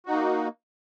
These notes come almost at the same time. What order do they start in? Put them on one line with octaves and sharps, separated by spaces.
F#4 D#4 A#3